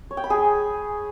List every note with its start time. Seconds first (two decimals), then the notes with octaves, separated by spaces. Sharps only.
0.11 C#5
0.17 G5
0.24 B5
0.30 G#4